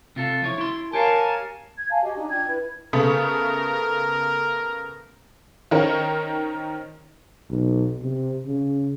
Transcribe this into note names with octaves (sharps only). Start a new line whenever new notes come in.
C3 F4 A4
F3 E4 C#5
E4 C6
G4 A#4 C#5 F5 G#5 A5
G#6
F5 G#5 A5
F#4 G4 D#5 G#5
D4 D#4
D4 F4 G5 G#6
E4 B4
C#3 A3 B3 A#4
D#3 C#4 D#4 A#4 C5 C#5
B1
C3
C#3